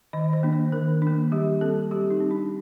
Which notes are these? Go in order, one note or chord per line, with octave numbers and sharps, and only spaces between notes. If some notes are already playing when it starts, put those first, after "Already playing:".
D#3 D#5
C5
A#3 D4
C5
D#3 A#4
A#3 D4
G3 G4
C4 A4
G3 G4
D#4
C4
D4